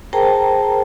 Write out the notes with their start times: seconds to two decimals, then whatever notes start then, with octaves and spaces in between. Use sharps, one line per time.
0.13 G#4 A#4 C5 G5 A5 A#5